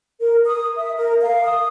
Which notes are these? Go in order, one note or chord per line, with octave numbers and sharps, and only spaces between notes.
A#4
D#6
E5
A#4
F5
D#6